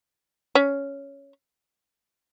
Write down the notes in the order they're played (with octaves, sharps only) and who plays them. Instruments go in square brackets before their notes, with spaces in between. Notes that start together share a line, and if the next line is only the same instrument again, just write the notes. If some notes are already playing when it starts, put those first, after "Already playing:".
[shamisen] C#4